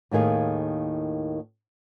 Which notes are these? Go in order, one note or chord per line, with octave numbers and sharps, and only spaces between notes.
D#2 A2 D#3 G#4 F5